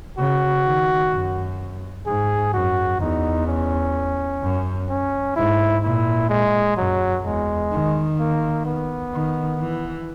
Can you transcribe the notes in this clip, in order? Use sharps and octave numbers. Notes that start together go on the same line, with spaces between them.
C#3 F#4
D#3
F#2
G#2 G#4
F#2 F#4
E2 D#4
C#4
F#2
C#4
G#2 E4
A#2 E4
G#3
F#2 F#3
E2 G#3
D#3
A#3
B3
D#3
E3